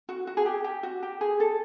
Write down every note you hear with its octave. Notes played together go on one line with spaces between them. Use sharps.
F#4
F#4
G#4
G4
G4
F#4
G4
G#4
A4